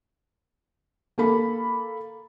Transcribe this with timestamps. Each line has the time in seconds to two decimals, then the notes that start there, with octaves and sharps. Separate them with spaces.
1.18 A#3 A4 B5